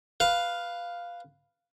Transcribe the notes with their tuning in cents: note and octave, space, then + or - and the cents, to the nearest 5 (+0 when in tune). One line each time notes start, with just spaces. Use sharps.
B4 +0 F5 +0